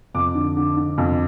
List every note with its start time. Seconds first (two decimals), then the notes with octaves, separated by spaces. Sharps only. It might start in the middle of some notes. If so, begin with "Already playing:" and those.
0.14 F2 D6
0.35 D3
0.57 D3
0.77 D3
0.98 F2